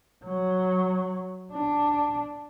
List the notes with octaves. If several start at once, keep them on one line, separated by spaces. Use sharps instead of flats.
F#3
D4